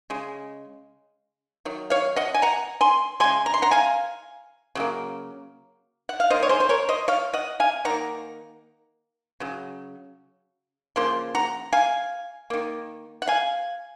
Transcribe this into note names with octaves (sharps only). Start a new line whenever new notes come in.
C#3 G#3
D#3 F#3
C#5 F5
D#5 F#5
G#5
F#5 A#5
G#5 C6
C#3 G#3 G#5 C6
A#5
C6
F#5 A#5
F5 G#5
C#3 F#3 A#3
F#5
F5
D#3 A#3 C5 D#5
C#5
G#4 C5
C5
A#4 C#5
C5 D#5
C#5 F5
D#5 F#5
F5 G#5
D#3 A#3 F#5 A#5
C#3 F#3
C#3 F3 A#3 C6
F#5 A#5
F5 G#5
D#3 A#3
F#5
F5 G#5